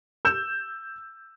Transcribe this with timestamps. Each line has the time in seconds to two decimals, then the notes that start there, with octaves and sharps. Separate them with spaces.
0.25 E6 G6 E7